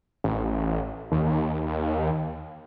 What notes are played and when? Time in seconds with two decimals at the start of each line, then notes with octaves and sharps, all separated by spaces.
0.24 A1
1.12 D#2